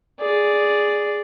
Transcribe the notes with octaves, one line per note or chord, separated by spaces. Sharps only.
G#4 D5